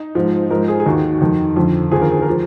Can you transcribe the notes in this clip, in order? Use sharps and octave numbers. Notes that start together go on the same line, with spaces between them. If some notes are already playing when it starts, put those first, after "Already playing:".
Already playing: D#4
G#2 F3
G#2 F3 A#4
G#4
G#4
D#2 D#3 F#4
F2 D#3
F2 D3 F3
D#2 D3 F3 G#4
A#4
G#4
A#4
F3